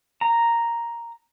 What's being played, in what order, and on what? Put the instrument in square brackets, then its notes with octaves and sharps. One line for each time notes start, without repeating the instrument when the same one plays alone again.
[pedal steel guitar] A#5